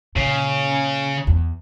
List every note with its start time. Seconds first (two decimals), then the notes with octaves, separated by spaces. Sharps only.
0.16 A#2 C#3
1.27 E2